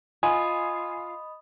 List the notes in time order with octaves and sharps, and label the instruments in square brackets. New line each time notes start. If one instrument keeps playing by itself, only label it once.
[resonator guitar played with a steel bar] F4 [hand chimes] D#5 B5 D#6 [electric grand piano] G#5